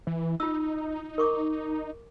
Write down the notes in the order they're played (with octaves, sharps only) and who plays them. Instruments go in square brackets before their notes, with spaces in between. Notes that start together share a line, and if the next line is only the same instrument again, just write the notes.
[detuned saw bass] E3
[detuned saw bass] D#4 [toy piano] F4 E6
[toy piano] A#4 C#6 D6